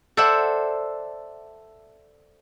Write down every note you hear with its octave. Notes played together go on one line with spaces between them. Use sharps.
A4 C5 D5 E5 F#5